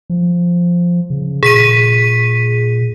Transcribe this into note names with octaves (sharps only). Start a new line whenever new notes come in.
F3
C#3
A#2 G#4 B6 D#7